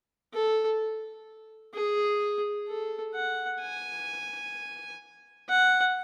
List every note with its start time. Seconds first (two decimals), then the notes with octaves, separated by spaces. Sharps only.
0.33 A4
1.74 G#4
2.68 A4
3.15 F#5
3.61 G#5
5.49 F#5